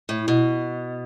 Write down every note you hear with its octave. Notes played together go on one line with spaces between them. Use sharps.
A2
B2